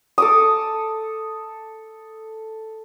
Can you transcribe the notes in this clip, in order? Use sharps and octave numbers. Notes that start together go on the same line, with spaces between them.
A4 D6 D#6